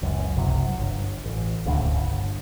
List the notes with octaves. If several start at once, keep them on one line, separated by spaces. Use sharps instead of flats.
F#1 C#2 F#2
F#1 C2 C3 F#3
G1
A1
D#1 C#2 A2 D3
G1